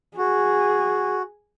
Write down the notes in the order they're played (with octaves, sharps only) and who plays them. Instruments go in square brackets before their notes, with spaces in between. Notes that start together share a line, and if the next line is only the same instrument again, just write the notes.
[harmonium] F#4 [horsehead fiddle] G#4